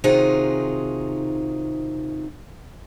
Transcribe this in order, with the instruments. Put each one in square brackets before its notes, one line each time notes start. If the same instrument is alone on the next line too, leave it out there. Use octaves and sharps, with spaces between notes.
[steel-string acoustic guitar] C3 D#3 D#4 F4 F#4 G#4